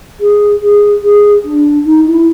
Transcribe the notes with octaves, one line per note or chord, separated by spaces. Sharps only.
G#4
G#4
G#4
D4
D#4
E4